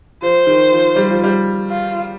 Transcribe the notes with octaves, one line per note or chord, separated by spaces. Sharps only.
F3 C5
D#3
F3
G3
F3
G3
F4